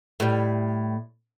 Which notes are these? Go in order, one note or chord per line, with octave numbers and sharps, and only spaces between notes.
A2 G3